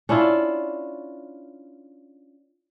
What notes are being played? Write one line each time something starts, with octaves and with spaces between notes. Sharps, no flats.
C#4 D4 E4 F4